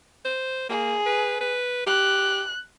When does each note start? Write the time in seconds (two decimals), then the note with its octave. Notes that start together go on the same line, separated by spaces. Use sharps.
0.25 C5
0.70 A#3 G#4
1.06 B4
1.41 B4
1.87 G4 F#6